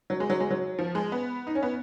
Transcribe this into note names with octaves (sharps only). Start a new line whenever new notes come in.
F#3
G#3
F#3
G#3
F#3
F3
G#3
B3
D#4
C#4
B3